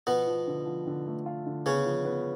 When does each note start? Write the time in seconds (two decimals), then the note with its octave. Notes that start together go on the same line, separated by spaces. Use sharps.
0.07 B2 F3 B3
0.27 F3
0.47 D3
0.66 F3
0.87 D3
1.06 A3
1.26 F4
1.46 D3
1.66 C#3 B3 C#4
1.86 F3
2.05 B3